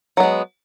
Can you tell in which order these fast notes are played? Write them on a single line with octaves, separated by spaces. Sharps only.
F#3 B3 G#3